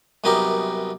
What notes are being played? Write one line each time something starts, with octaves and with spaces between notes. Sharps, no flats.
C2 F#2 B3 D#4 G4 A#4